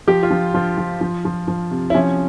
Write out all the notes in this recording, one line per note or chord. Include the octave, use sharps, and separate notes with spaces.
F3 G4
F4
F3
F3 F4
F3
F3
F3
F3
C3
E4
F3 C#4